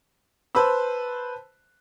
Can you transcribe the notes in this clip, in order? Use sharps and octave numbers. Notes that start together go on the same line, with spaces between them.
B4 C5 A5 B5 E6